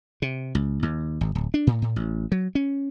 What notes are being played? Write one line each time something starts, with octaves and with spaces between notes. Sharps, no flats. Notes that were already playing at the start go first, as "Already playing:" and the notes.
C3
C#2
D#2
G#1
D1
D4
A2
A2
A1
F#3
C#4